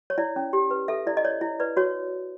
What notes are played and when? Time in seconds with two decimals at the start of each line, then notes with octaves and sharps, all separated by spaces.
0.10 C#5
0.18 E4 D5
0.36 C#4
0.53 G4
0.71 B4
0.88 A4 E5
1.07 E4 D5
1.17 D#5
1.24 C#5 D5
1.41 E4
1.60 B4 D5
1.77 F#4 C#5